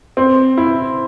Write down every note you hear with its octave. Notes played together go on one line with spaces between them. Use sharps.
C4
E4